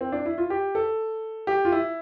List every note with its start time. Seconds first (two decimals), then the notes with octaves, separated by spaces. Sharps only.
0.01 C4
0.12 D4
0.26 E4
0.38 F4
0.50 G4
0.75 A4
1.47 G4
1.65 F4
1.72 E4